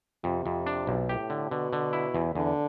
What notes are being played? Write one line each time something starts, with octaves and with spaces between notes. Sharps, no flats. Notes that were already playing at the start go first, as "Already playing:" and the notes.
F2 C3
F2
D4
B1
A2 G4
D3
B2 D3
D3
E4
E2
E2 D3